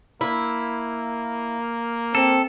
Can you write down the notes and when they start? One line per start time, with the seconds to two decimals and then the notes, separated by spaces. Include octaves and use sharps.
0.21 A#3 E4
2.15 C4 A4